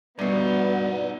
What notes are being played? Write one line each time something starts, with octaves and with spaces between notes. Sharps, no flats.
G2 B2 B3 D#4 D5 E5